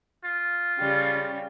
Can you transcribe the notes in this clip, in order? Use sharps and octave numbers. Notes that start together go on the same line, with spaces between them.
F4
C#3 G3